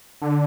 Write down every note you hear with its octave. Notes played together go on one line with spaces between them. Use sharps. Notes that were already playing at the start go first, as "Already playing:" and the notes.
D3